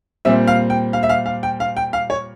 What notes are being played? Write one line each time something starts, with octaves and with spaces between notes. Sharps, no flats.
A#2 G3 C4 E5
F5
G5
F5
E5
F5
F5
G5
F5
G5
F5
C#5